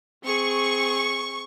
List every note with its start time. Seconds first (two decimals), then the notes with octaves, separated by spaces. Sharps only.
0.24 C4 G#4 C#6